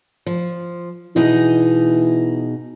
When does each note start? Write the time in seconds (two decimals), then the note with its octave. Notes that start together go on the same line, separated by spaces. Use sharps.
0.26 F3
1.16 B2 E3 D#4 G#4